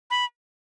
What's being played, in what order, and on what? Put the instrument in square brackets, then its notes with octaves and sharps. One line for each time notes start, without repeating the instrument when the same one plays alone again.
[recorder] B5